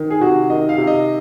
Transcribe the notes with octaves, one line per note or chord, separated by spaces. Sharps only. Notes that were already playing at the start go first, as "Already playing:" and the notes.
Already playing: D#3
G#4
C3 F#4
D#3 D#5
F5
C3
D#5